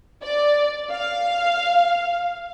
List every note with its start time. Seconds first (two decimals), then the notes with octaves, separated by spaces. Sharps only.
0.22 D5
0.91 F5